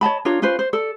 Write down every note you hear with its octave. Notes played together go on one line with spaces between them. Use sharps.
C#5 D#5 A5 B5
D4 F4 A#4 C#5
C#4 F4 B4 C5
C5
A4 D5